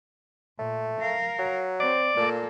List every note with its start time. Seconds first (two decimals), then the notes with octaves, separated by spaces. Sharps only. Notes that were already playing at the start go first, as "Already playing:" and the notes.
0.59 A#2 A3
1.00 A#4 F5
1.39 F#3
1.80 C4 D5
2.17 A#2 A#3 A4